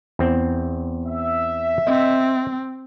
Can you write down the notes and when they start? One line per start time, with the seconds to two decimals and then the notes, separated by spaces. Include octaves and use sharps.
0.19 E2 C4
1.06 E5
1.87 C4 D#5